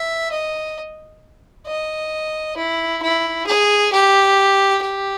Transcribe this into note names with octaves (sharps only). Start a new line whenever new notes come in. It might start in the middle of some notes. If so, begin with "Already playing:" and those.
Already playing: E5
D#5
D#5
E4
E4
G#4
G4
G4